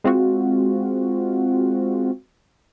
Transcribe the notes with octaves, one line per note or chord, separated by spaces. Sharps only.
G#3 C4 F4 F#4